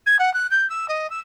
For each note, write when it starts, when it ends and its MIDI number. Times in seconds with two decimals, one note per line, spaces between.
0.06 0.17 92
0.19 0.32 78
0.33 0.49 90
0.50 0.68 91
0.69 0.86 88
0.88 1.09 75
1.10 1.19 88